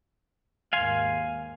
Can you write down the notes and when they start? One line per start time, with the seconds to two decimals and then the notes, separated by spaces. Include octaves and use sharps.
0.73 D#2 G#2 F5 G#5 C6